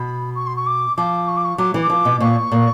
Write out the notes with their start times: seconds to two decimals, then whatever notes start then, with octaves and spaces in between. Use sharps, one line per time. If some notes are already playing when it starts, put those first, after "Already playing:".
Already playing: B2 B5
0.35 C#6
0.47 C6
0.56 C#6
0.67 D6
0.97 F3 D6
1.28 C#6
1.37 D6
1.45 C#6
1.58 F#3 D6
1.74 E3
1.83 D6
1.90 F3
2.05 B2
2.20 A#2 C#6
2.52 A#2